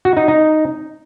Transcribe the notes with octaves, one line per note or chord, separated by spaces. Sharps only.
F#4
D#4
D#4